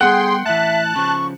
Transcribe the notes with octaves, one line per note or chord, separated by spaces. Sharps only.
G3 B3 G#4 A4 F#5 G5 C6
A2 E3 E5 A5 F#6
C#3 F3 C#6